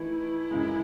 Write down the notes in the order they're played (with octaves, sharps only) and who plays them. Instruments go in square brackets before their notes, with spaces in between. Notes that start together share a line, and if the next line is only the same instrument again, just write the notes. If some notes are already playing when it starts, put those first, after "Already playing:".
Already playing: [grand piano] E3 A3 D#4 [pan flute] E4
[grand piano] F#2 C#3 G#3